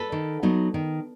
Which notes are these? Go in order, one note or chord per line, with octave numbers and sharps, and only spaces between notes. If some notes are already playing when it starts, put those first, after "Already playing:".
Already playing: A4 B4
D#3
F#3 B3 D#4
D#3